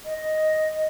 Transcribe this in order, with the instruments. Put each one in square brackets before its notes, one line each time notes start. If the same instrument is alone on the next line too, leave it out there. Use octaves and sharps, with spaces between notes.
[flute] D#5